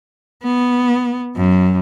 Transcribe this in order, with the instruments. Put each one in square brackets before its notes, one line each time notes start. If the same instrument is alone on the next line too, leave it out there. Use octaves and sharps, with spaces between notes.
[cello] B3
F#2